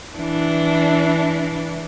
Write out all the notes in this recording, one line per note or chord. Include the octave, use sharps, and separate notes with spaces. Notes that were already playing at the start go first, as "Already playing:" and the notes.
E3 D4